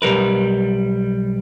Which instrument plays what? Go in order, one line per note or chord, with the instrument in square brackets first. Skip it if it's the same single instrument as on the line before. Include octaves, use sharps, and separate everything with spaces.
[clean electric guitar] B1 G3 A#4 B4